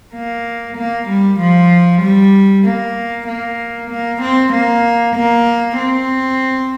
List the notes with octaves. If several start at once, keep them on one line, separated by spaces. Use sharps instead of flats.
A#3
A#3
G3
F3
G3
A#3
A#3
A#3
C4
A#3
A#3
C4